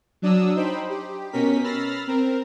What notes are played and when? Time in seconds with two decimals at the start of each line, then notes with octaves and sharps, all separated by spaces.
0.22 F#3 D4 D#6 E6
0.56 D#4 C5 G5 B5
0.89 G4
1.32 B2 C#4 A#4 B6
1.64 B5 E6 F6 A6 A#6 C7
2.07 C4 A#4